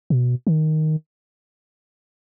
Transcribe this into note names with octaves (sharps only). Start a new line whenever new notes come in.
B2
D#3